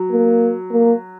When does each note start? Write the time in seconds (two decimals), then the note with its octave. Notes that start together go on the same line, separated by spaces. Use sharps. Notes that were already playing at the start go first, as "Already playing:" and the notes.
Already playing: F#3
0.12 A#3
0.72 A#3